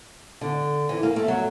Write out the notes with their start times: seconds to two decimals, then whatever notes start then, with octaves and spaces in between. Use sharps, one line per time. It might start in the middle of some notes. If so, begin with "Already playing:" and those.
0.41 D3
0.89 E3
1.03 A#3
1.16 A3
1.28 F#3